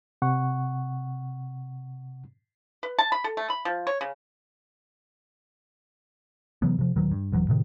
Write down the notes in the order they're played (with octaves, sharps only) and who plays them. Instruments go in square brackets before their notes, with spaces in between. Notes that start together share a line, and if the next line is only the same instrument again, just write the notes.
[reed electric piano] C3 F#5 C#6
[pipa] B4
A5
B5
A4
A3
B5
F3
C#5
C#3
[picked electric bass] C3 E3 F#3 B3
C3 F3
D#1 D#3 F#3
G2
D#1 E3 F#3
A2 C3 D#3